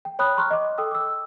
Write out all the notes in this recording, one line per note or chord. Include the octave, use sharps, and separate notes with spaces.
G5
C#5 G5 B5 D#6 F#6
A#5 C6 C#6 F6 F#6
D#5 D6
A4 G5 D#6 E6
D6 E6